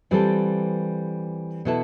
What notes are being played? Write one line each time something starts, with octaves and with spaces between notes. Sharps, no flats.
E3 G3 C4 F4 A4
B2 B3 E4 A4